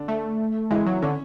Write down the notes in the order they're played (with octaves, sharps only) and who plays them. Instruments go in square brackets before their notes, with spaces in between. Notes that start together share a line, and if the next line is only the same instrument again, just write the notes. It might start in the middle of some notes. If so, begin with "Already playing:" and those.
Already playing: [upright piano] D3 D4
[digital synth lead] A3
[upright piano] E3 E4 [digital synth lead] G#3
[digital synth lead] F#3
[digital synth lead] D3 [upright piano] C#4 C#5